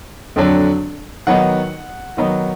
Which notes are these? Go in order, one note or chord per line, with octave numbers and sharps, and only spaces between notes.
F2 D3 F#3 D4
D#3 F#3 B3 D#4 F#5
D#3 F#3 B3 D#4